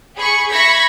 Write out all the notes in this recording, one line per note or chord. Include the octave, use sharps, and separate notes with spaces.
G#4 B5 C#6
E5 B5 C#6 G#6 A#6 B6